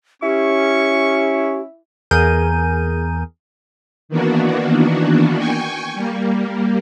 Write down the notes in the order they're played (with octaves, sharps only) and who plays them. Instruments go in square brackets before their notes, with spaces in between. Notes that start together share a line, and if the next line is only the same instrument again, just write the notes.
[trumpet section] C#4 [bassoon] E4 [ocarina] G4 [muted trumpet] C#6
[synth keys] E2 G#4 A#4 G6 D#7
[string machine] D#3 E3 A#3 B3 D4 F#4
G5 G#5 C#6
G3 A#3